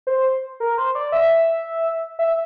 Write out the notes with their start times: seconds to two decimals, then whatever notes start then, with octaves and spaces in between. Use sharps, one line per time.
0.07 C5
0.60 A#4
0.78 C5
0.95 D5
1.12 E5
2.19 E5